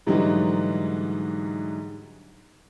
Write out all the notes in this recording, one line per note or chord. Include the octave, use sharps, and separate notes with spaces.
G#2 D3 E3 F#3 G3 D#4